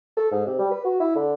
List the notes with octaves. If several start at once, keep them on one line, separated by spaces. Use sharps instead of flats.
A4
G#2
C3
G3
B4
F#4
E4
D3